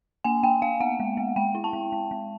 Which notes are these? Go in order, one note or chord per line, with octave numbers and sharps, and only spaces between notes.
A#3 G#5
A#3 G5
A#3 F5
B3 F#5
G#3
B3
G#3 G5
E4
A5
G#3
G#3
G#3